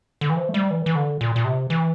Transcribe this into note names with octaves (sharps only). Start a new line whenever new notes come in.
D3
E3
F3
A3
G3
E3
E3
D3
A#2
A#2
C3
E3